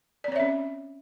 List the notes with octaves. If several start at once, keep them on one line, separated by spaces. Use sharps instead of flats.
C4 C#4 C#5 D5 E5